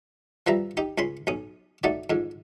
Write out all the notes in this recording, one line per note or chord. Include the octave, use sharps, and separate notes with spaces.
F3 G3 B4 E5 A#5
D#4 G4
C#2 C#4 B5 C6
B1 C#4 D#6
A3 D#4 F#4 D5
F2 G#2